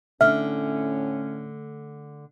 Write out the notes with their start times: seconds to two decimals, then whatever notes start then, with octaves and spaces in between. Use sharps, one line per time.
0.21 A2 D3 A3 C#4 E5 F6